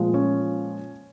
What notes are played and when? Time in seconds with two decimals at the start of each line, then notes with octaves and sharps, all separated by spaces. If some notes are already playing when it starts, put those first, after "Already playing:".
Already playing: A#2 F3 G#3
0.14 C#4